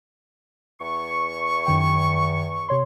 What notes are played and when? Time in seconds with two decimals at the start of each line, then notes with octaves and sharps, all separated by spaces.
0.81 E2 C#6
1.66 F#2 D#3 G5
2.68 C3 C#5 C6